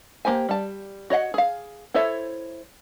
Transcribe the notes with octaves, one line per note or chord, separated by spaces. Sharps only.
A#3 G4 C5 G#5
G3 A5
F#4 C#5 D#5 F#5
G#4 F5
E4 A4 C5 C#5 E5